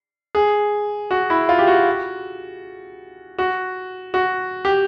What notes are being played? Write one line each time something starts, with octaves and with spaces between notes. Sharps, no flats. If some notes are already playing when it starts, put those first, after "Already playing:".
G#4
F#4
E4
F4
G4
F#4
F#4
F#4
G4